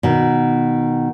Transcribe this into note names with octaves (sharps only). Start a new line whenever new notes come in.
B2 D#3